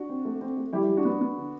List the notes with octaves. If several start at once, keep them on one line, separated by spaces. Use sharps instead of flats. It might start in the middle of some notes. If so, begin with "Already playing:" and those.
Already playing: D4 F#4
C4
A3
C4
A3
G3 E4 G4
G3
D4 F#4
B3
B3
D3